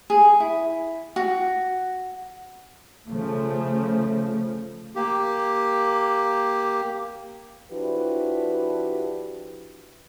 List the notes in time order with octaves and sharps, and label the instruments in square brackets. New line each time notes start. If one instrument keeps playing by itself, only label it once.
[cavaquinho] G#4
E4
F#4
[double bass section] C#3 F3 A3
[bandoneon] A#3 G4
[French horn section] F3 D4 E4 F#4 G4 B4